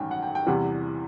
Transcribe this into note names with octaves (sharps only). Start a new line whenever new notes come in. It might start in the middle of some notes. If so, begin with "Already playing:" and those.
Already playing: A1 G2 D#3 C#4 G5 G#5
F#5
G5
G5
E2 C3 E3 G3 F#5